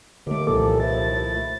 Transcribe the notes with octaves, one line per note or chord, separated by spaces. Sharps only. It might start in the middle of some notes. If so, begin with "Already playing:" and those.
D#2 D3 A3 D6
C2 A#2 E3 F3 A#3 A4
F3 A3 E4 A6